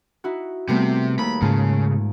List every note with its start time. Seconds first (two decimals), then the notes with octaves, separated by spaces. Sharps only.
0.24 D#4 E4 F#4
0.68 C3 G3 A3 B3
1.19 D#2 B5
1.42 G#2 C#3 F4 A5